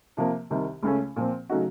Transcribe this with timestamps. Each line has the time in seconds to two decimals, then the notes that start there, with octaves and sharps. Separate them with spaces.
0.17 C3 F3 A#3
0.51 C2 C3 D#3
0.83 C#2 C#3 A3 C#4
1.16 A#2 F3 C4
1.49 C#3 F#3 A3 D#4 F#4